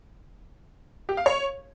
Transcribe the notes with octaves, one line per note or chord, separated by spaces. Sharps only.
G4
F5
C#5